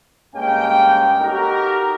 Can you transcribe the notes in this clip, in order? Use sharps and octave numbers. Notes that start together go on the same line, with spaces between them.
G2 G#3 A#3 C#4 G5
D#4 F#4 G4 A4 A#4